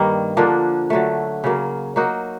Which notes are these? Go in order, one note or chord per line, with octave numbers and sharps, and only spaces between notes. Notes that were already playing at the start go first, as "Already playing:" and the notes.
Already playing: G2 D#3 G3 A#3
D3 F3 A#3 D4
D3 F#3 A3
C#3 F#3 A#3
F#3 A#3 D#4 F#4